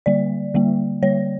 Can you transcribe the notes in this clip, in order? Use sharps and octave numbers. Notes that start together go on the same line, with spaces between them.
D3 G3 A#3 D5
D3 G3 A#3
D3 G3 A#3 C#5